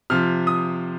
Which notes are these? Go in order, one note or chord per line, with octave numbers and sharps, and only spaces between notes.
C3 F3 F6
D#6